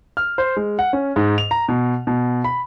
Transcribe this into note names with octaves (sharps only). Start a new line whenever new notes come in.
F6
C5
G#3
F#5
C#4
G#2
F7
A#5
B2
B2
B5